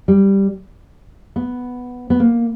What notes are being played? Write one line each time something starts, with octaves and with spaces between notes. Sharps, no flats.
G3
B3
B3
A#3